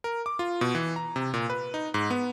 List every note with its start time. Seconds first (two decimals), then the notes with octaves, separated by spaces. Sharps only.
0.04 A#4
0.26 D6
0.39 F4
0.61 B2
0.75 E3
0.96 A#5
1.16 C3
1.34 A#2
1.50 B4
1.74 D#4
1.94 G#2
2.10 B3